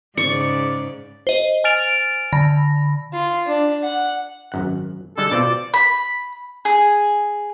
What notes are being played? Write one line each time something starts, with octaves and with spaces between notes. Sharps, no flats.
G#2 C#3 D5 C#6
C5 D#5
G#5 F6 A6 D7 F7
D3 B5 A#6
F4
D4
F#5
G#1 F#2 F#5
D3 G3 G#3 A4
B2 C4 F4 D5
B5
G#4